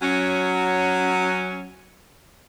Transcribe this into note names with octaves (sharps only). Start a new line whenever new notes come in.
F#3 C#4